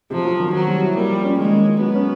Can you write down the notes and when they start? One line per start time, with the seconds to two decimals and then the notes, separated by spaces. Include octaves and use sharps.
0.10 C3 F3
0.25 F#3
0.40 D#3
0.54 F#3 C4
0.68 G3
0.82 E4
0.96 G3 A#3
1.10 F3
1.24 C#4
1.38 D#3 G#3
1.53 A#3
1.67 F#3
1.81 F#3 B3
1.95 C#4